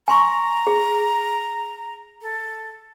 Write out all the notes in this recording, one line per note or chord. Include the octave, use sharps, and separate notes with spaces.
G#5 A#5 C6 C#6
G#4
A4